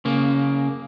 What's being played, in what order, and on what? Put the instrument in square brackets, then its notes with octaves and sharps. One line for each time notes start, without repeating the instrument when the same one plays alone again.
[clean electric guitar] C#3 A#3